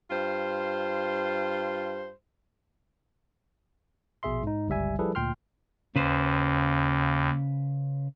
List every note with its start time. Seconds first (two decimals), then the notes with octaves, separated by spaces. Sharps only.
0.11 G2 F4 C5
4.23 A#1 B2 G#4 E5 C6
4.43 G#2 D#4
4.68 G1 C#2 G3 E5 G#5
4.99 F3 G3 E4 G#4 A4 B4
5.15 D2 A#2 G5 C6 F6
5.96 D#2 C#3 B4 C5